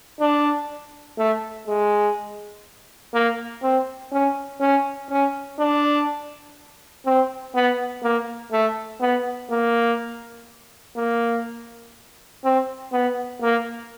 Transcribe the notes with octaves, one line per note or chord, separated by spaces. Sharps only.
D4
A3
G#3
A#3
C4
C#4
C#4
C#4
D4
C4
B3
A#3
A3
B3
A#3
A#3
C4
B3
A#3